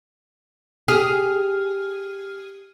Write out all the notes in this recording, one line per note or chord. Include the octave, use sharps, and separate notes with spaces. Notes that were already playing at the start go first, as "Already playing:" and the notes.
G4 G#4 F6